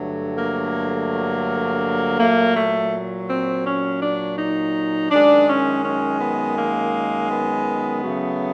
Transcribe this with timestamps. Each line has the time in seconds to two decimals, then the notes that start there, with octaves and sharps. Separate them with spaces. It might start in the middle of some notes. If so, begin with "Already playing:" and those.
Already playing: G2 D3 F#3 A3
0.38 A#3
2.20 A#2 F#3 A3 A#3
2.56 A3
3.29 C4
3.66 C#4
4.02 D4
4.38 D#4
5.11 F#2 D#3 G#3 D4
5.48 C#4
5.84 C#4
6.20 B3
6.56 A#3
7.29 B3
8.02 C#3 F#3 A3